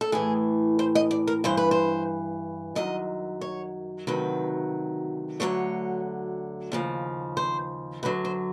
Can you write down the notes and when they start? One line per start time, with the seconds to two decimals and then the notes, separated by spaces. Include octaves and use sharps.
0.01 A4
0.12 A2 E3 G#4
0.79 C5
0.95 D#5
1.11 D5
1.27 A#4
1.44 G2 E3 C5
1.57 B4
1.71 C5
2.75 F#2 D#3 F#3 D#5
3.41 C#5
4.07 D2 C3 D#3 F#3 B4
5.40 D2 D3 F#3 C#5
6.72 D#2 C#3 F3
7.37 C5
8.03 F#2 D3 F#3 B4
8.25 C5